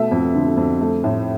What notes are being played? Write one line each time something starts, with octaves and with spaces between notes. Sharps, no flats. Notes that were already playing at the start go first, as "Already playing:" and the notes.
Already playing: B2 A3 E5
F2
D3
F2
A3
A2